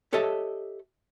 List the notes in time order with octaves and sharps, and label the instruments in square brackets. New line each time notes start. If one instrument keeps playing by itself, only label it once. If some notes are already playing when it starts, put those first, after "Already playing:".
[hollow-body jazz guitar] G4 A4 C#5 D#5 E5 A5